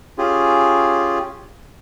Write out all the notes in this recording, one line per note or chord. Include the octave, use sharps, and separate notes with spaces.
C#4 F4 G4 G#4